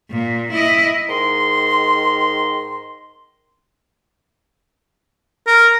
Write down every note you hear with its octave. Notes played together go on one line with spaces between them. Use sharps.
A#2
E4 D#5
G#2 D#3 A#5 C6
A#4